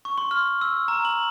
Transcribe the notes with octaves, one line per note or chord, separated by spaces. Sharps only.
C#6
C6
F6
E6
A#5
F#7